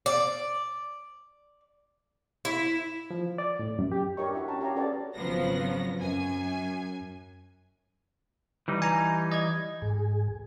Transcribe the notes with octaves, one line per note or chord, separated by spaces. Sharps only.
D5
E4
F3
D5
A2
F#2
G4
D4 G4 A#4 C#5 D#5 C#6
E4 F#4 G4 E5
C#4 G5 A5 A#5 C#6
G4 C#5 F5 A#5
C#4 F#4 G#4 A4 B4 D5
G#1 C#3 F3 F#3 B3 A#6
F#2 G#5
E3 G3 D#4
G#5 A#5
D#5 G#6
G#2 G#4